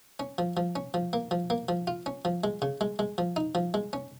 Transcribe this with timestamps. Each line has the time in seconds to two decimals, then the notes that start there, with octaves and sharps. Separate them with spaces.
0.20 C#4
0.38 F3
0.57 F3
0.76 C#4
0.94 F3
1.13 A#3
1.31 F3
1.50 A#3
1.69 F3
1.87 F4
2.06 C#4
2.25 F3
2.44 G#3
2.62 C#3
2.81 G#3
2.99 G#3
3.18 F3
3.36 D#4
3.55 F3
3.74 G#3
3.93 C#4